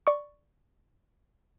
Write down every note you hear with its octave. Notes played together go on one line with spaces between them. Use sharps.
D5 C#6